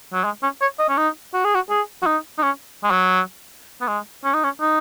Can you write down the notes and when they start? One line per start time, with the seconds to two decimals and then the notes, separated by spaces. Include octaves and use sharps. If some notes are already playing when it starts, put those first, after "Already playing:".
0.13 F#3
0.24 G#3
0.43 C#4
0.61 C#5
0.79 D#5
0.89 C#4
0.97 D#4
1.34 F#4
1.45 G#4
1.55 F#4
1.70 G#4
2.02 F#4
2.06 D#4
2.38 D#4
2.43 C#4
2.84 G#3
2.91 F#3
3.81 B3
3.88 G#3
4.24 C#4
4.34 D#4
4.44 C#4
4.61 D#4